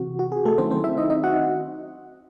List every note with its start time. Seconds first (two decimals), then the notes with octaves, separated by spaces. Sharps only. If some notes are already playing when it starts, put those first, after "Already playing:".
Already playing: C3 E3 C4 F#4
0.19 F#4
0.32 G#4
0.45 A3 A4
0.58 D#3 F#3 A3 C4 C#4 E4 C5
0.71 C4 C5
0.84 E4 E5
0.97 D#4 D#5
1.10 D#4 D#5
1.23 F#4 F#5